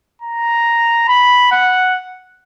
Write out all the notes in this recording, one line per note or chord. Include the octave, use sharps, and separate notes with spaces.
A#5
B5
F#5